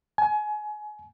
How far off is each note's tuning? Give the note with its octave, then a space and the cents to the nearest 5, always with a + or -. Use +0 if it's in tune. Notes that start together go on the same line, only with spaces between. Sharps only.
G#5 +30